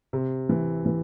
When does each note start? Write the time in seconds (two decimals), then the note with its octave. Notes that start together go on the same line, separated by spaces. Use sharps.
0.13 C3
0.49 E3
0.86 E3